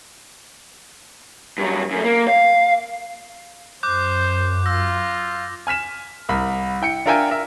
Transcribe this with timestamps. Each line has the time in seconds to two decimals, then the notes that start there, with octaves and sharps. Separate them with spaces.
1.58 G2 F#3
1.91 F#2 A3
2.04 A#3
2.28 F5
3.83 F#2 C5 D6 F#6 G6
4.66 F4 E6 A#6
5.67 G#5 F6 B6 E7
6.29 C2 A#4 B5
6.81 E4 G5 C#7
7.06 D4 F4 A#4 E5 G5 G#5
7.30 A#4 E5